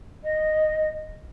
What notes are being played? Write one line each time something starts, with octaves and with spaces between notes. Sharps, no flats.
D#5